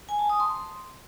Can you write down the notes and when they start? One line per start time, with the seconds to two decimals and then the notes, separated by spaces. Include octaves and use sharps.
0.09 G#5
0.19 A5
0.30 D#6
0.40 C6